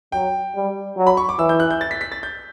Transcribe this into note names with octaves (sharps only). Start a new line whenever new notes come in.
F#3 G5
G3
F#3
B5
C#6
D6
E3 E6
G6
F#6
G6
A6
B6
B6
A6
G6